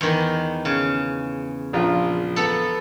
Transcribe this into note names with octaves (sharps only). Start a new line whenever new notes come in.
E2 D#3
C#3
A#1 F4
B3 A4